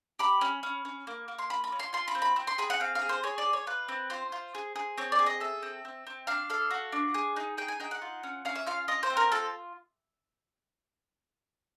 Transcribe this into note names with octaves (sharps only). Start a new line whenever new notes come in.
G4 B5
C#4
C#4
C#4
A#3
A#3
C6
F4 B5
B5
C#4
C6
F4 C6
B5
C4
B5
C4
C6
G#4 B5
F#5
C4 F5
F5
G#4
C5
G#4 C#5
D5
G#4
C#5
F4 B4
C4
F4 C5
F4
G#4
G#4
C4 C#5
D5
G#4
D#5
A4 E5
C4
C4
C4
D4 F5
A4 F5
F#4
D4
G#4
D#4
G#4 G5
G#5
D#4 G5
F#5
F4
C#4
C#4 F5
E5
F4 F5
F4 D#5
C5
C4
A#4
F4 A4